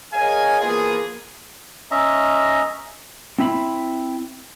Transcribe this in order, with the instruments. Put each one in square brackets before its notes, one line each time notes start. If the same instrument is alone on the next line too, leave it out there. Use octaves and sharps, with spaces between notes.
[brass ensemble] G#4 A#4 C#5 D#5 F5 G#5
E3 F3 A#3 B3 F4 G#4
[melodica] C#4 D#5 E5 A#5
[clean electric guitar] C4 E4 E5 A#5 B5